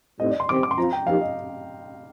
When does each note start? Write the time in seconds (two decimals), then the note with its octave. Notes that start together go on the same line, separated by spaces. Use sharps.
0.19 A2 G3 C4 D#4 D#5
0.30 D5
0.40 C6
0.49 D#3 G3 C4 G4 D6
0.63 D6
0.71 C6
0.77 F3 C4 F4 A#5
0.93 G5
1.07 F3 A#3 D#4 G4 F5
1.21 D#5